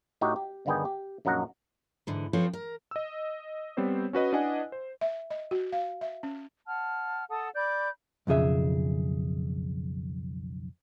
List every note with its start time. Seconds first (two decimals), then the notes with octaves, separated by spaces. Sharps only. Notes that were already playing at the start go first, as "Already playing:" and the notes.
0.21 A2 D#4 F#4 G4
0.36 G4
0.66 G1 D3 D#3 B3 G#4 G5
0.85 G4
1.25 A#1 F#2 F#3 D#4 F#5 A#5
2.07 G#2 D3 E3
2.33 F3 C4 F4 A4 B4 C#5
2.53 A#4
2.91 D#5 E6
3.77 G3 B3 C4 C5 C#5
4.13 C#4 F#4 B4 D#5
4.33 D4 E4 B4 D#5 F#5 G#5
4.72 C5
5.01 E5
5.31 D#5
5.51 F#4
5.72 F5
6.01 E5
6.23 C#4
6.67 F#5 A5 F6
7.29 A4 F#5 A5 D#6
7.54 D5 B5 D6 G6
8.27 B1 F2 C#3 G#4 E5